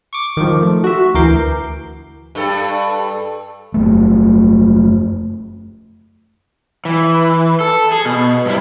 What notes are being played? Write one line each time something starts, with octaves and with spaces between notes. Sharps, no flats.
C#6 D6
D#3 F3
A3
F#4 E5
D2 E3 A#4 D6 G6 C7
G2 A4
F#1 C#2 A3
E3
A4
G#4
B2
G2 C3 E4